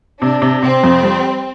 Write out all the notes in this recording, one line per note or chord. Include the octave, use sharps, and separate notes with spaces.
C3 D4
C3
C3 C4
F2
G3